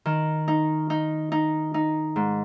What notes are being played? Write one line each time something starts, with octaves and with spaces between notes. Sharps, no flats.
D#3
D#4
D#4
D#4
D#4
G#2